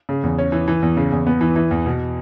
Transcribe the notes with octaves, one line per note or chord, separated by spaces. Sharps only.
C#3
E2
C#4
E3
E3
E2
C#3
E2
B3
E3
E3
E2
B2